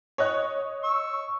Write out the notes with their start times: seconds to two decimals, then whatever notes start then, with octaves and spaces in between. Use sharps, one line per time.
0.18 C#5 D#5 F#6
0.83 C#6 E6